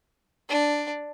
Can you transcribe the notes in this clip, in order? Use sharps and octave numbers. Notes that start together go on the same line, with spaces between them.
D4